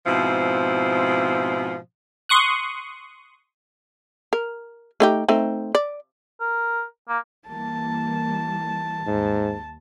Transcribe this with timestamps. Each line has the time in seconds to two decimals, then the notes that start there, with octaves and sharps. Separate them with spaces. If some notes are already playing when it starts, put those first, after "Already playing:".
0.06 G#2 B2 F3 C4 E4
2.29 C6 C#6 D#6 F#6
4.33 A#4
5.00 A3 D#4 G4
5.28 A3 C4 D#4
5.75 D5
6.40 A#4
7.08 A#3
7.48 E3 G3 A#3 A5
9.07 D#2 G#2